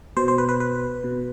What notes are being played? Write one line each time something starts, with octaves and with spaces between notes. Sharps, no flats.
B2 C5
C5
B4
B4
B4
B2